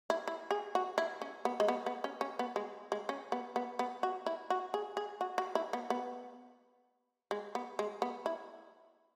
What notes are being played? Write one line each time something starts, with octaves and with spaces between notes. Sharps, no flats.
E4
E4
G#4
F#4
E4
C#4
B3
G#3
B3
B3
C#4
C#4
B3
G#3
G#3
C#4
B3
B3
B3
F#4
E4
F#4
G#4
G#4
F#4
F#4
E4
B3
B3
G#3
B3
G#3
B3
E4